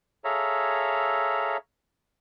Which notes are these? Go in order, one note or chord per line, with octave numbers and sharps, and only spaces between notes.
G#4 A4 C#5 E5 F5 A#5